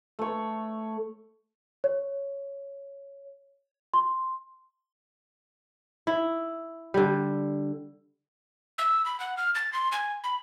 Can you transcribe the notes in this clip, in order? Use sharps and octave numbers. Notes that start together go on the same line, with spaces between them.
A3 C#5
C#5
C6
E4
D3 G3
E6
B5
F#5
F6
A6
C6
G#5
B5